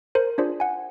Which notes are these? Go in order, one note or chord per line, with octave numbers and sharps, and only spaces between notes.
A#4 C5
D4 F4 G#4 C5 D5
F#5 G#5